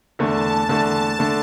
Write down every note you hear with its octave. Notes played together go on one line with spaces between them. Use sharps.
E2 D3 A3 A5
E2 D3 A3 A5
D3 A3